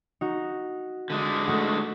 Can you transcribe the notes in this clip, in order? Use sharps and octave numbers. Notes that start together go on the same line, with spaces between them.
D#4 F#4
D3 G#3
A3 F#4